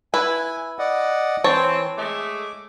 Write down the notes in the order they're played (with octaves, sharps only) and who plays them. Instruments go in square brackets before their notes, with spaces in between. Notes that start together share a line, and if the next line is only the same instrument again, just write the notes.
[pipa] E4 [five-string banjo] B4 [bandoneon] G#5
[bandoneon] D5 D#5 F#5
[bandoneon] E3 [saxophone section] C4 [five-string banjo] C#5 [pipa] A5
[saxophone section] G#3 A3 [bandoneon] D6